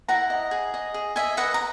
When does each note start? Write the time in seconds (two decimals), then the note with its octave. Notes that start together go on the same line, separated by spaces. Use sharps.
0.08 E4 F#5 A#5
0.30 D#5
0.51 G#4
0.74 D#5
0.94 G#4
1.16 D#5 E5 G#5
1.37 B4 D#5 F#5
1.54 A#5